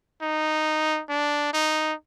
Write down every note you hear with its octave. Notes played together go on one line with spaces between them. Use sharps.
D#4
D4
D#4